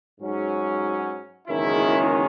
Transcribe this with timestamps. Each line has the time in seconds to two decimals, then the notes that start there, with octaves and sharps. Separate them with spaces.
0.19 G#2 F#3 C#4
1.48 F#1 E2 D#3 G#3 C#4 E4